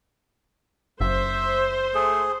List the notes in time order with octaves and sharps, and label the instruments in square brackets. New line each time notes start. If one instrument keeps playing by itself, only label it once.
[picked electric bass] F#1 [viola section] C5 [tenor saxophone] E5
[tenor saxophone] A3 [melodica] G#4